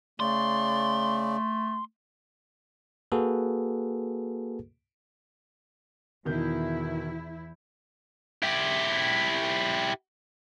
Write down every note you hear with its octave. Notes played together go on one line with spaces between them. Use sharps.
C#3 A3 D5 C6
A#3 F#4 G#4 A4 B4
E2 B2 D#3 E4 G6
E4 G4